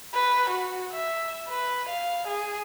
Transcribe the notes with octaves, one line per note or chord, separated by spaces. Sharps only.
B4
F#4
E5
B4
F5
G#4